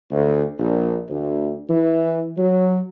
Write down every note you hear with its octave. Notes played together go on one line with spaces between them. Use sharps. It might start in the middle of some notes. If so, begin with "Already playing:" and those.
D2
A#1
D2
E3
F#3